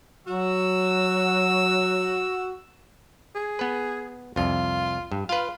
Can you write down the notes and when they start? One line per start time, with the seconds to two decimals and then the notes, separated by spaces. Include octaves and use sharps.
0.27 F#3 F#4 E6
3.35 G#4
3.59 B3 B4
4.36 C2 F2 F4
5.12 G2
5.29 F4 B4 F5